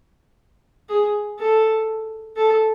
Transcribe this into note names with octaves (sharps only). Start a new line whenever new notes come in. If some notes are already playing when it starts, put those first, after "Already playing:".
G#4
A4
A4